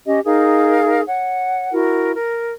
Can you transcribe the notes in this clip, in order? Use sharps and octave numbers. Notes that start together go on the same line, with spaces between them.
C#4 G4 D#5
D#4 G#4 A#4 F5
C#5 F#5
E4 F#4 A#4
A#4